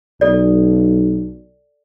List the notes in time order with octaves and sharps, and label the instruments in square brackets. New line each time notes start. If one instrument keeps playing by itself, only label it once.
[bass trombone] B1 [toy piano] A4 D5